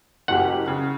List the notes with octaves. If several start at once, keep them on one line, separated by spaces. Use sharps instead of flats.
F#1 F#3 G4 F#5
C#3